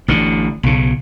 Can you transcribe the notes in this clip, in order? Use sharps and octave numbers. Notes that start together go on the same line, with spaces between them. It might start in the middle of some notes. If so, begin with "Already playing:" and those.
A1 D3
B1 C#3